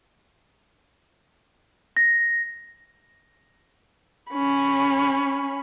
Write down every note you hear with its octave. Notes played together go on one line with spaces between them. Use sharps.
A#6
C#4 B5